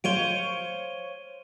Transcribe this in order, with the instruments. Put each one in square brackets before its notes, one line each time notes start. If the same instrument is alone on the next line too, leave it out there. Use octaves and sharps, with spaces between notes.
[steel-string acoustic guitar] C5 C#5 F5 [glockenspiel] D7 D#7 G7